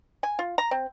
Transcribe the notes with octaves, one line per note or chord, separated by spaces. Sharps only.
G#5
F4
A#5
C4